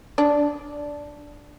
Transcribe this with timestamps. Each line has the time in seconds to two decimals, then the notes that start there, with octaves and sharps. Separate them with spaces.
0.18 D4